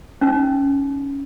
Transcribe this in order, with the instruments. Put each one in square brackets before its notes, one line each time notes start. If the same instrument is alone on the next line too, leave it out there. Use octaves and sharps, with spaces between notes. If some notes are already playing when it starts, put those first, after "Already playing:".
[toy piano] C#4 D#4